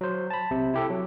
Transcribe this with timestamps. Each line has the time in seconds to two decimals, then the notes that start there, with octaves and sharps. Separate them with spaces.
0.01 F#3 C5
0.30 A5 B5
0.51 B1 C3
0.74 E4 G4 A4
0.90 F#3